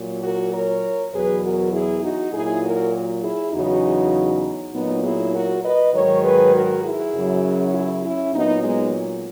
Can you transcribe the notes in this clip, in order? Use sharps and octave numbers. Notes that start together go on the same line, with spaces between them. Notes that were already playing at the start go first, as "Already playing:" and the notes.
Already playing: A#2 F#3
F#4 A#4
A#4 C#5
E2 B2 F#3 G#4 B4
F#4 A#4
E4 G#4
D#4 F#4
A#2 F#3 E4 G#4
F#4 A#4
E4 G#4
E2 C#3 F#3 D#4 F#4
A#2 F#3 B3 D#4
E4 G#4
F#4 A#4
B4 D#5
G#2 D#3 F#3 A#4 C#5
G#4 B4
F#4 A#4
E4 G#4
F#2 C#3 F#3
E4 G#4
C#4 E4
A#2 F#3 B3 D#4
G#3 B3